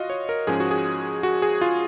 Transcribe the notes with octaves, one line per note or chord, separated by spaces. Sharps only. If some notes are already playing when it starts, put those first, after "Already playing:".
Already playing: F4 F#4 D#5 F5
C#5
A#4
G#2 F3 G#3 C#4 G#4
F#4
G#4
F#4
G#4
F4